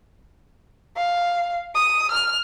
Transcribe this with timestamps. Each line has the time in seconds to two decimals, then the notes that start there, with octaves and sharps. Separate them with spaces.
0.97 F5
1.75 D#6
2.11 F6